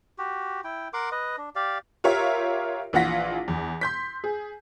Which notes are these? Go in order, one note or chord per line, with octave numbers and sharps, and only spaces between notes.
F#4 G4
E4 G5
A#4 F#5 C6 D6
B4 D#5
D4
G4 D5 F5
F4 G4 A#4 C#5 E5
A#1 E3 F4 F#5 A#6 B6
E2
C6 G6 B6
G#4